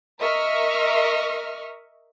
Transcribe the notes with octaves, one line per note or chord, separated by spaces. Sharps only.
A#4 D#5 E5 C#6 F6